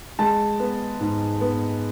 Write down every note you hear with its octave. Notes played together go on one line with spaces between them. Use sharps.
G#3 A5
B3
G#2
B3